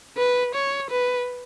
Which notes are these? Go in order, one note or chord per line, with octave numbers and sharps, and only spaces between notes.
B4
C#5
B4